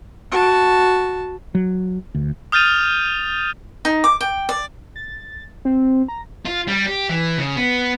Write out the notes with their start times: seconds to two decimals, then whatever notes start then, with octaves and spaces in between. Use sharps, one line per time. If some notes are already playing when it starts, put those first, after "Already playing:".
0.32 F#4 A5
1.55 F#3
2.15 D2
2.52 D#6 F6 G6 A6 D#7 F7
3.85 D#4
4.04 D6
4.21 G5
4.49 D5
4.96 A6
5.65 C4
6.08 A#5
6.46 F4
6.68 G3
6.86 G4
7.09 E3
7.38 C#3
7.56 B3